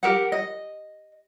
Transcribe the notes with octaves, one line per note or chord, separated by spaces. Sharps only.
G4 A#4 F#5
D#5